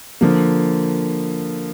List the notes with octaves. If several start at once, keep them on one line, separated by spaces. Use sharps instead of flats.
D3 F3 A#3